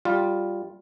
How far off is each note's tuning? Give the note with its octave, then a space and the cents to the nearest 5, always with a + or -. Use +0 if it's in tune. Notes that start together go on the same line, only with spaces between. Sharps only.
G3 +0 F4 +5